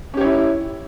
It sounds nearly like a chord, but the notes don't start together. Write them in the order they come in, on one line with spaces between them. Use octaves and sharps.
C#4 G4 C#5 E4